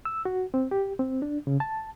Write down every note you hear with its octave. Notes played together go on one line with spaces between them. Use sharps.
E6
F#4
C4
G4
C4
D4
C#3
A5